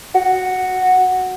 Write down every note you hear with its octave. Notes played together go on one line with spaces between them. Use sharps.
F#4